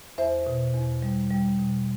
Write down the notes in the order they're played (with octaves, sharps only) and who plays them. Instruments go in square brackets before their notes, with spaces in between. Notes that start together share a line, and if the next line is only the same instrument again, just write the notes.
[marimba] E2 C5 E5
B2
E2
G3
G3
B2